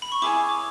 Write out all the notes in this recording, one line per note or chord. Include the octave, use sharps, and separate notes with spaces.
B5
C#6
E4 G#4 C#5 G#5 D6
D6